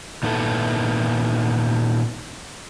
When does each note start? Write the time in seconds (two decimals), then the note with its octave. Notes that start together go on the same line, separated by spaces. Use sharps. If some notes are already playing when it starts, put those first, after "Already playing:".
0.23 A#2 D#3 B3 E4 A4